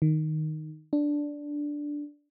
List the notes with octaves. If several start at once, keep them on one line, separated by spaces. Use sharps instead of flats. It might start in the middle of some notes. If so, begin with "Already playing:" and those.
D#3
D4